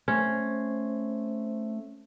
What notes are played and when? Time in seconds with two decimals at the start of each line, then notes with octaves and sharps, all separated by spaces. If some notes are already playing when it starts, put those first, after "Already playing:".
0.08 A3 C4 C#4 C5